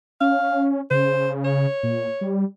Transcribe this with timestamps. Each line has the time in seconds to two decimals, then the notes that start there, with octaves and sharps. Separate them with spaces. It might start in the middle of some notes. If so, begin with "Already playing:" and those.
0.21 C#4 F5
0.91 C#3 C5
1.45 C#5
1.83 A#2
2.21 G3